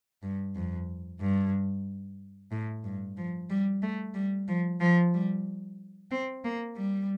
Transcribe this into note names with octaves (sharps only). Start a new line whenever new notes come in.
G2
F2
G2
A2
G2
F3
G3
A3
G3
F3
F3
G3
C4
A#3
G3